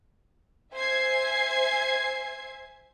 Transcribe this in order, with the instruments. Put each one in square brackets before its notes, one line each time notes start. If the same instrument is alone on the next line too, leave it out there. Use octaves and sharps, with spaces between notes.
[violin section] C5 E5 G#5 G#6 C7